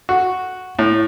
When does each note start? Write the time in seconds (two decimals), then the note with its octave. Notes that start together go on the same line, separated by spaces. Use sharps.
0.09 F#4
0.79 A2